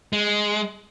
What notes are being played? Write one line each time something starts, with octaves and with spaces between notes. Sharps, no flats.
G#3